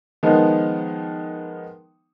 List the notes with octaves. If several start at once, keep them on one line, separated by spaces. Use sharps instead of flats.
D#3 F3 G#3 B3 D#4